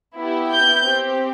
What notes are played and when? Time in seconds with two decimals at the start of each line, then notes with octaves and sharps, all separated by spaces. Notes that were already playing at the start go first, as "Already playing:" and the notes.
0.16 B3 E4 G4
0.51 G6
0.85 C4 G4